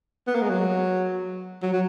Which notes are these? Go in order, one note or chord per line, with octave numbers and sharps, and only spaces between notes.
B3
A#3
G#3
F#3
F#3
F#3